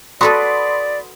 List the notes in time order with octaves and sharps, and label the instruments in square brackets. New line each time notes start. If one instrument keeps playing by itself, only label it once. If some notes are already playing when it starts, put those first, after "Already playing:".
[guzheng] F#4 A4 B4 [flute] D5 [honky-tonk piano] B5 C6 D#6